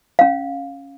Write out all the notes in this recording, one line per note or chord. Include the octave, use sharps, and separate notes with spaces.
C#4 F5